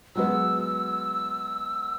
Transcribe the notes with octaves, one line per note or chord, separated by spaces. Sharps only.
F#3 G#3 B3 E6